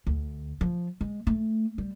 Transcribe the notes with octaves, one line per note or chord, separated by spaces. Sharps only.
D2
F3
G#3
A3
G3